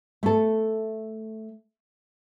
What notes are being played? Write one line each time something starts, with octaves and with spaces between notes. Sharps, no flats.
A3 A4